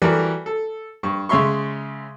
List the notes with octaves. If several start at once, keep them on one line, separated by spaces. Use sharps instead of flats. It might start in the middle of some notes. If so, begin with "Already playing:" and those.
E3 G3 F#4 A4 A#4 D5
A4
G2 C#6
C#3 G#3 C#5 E5 C6 C#6